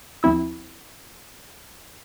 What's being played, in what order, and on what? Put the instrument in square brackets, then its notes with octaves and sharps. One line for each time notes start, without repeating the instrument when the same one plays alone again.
[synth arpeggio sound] D#2 F3 C4 E4 E6